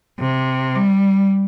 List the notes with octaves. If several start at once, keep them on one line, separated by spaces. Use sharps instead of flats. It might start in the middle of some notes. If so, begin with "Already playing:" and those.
C3
G3